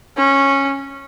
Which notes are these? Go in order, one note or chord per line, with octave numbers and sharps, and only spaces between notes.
C#4